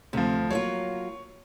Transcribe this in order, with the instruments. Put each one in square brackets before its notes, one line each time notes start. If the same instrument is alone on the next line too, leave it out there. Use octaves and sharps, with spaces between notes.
[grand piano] D2 F3 [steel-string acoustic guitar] C3
[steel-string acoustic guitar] F#3 A#3 F4 [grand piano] C#5